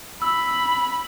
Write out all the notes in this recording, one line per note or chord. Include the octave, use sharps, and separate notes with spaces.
B5 E6